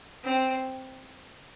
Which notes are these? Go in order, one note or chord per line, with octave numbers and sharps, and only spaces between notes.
C4